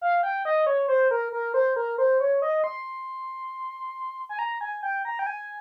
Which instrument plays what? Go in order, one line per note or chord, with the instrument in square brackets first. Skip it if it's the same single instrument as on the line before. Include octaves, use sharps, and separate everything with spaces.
[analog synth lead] F5
G5
D#5
C#5
C5
A#4
A#4
C5
A#4
C5
C#5
D#5
C6
G#5
A#5
G#5
G5
A#5
G5
G#5